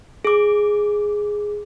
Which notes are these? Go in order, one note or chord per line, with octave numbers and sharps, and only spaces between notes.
G#4 D6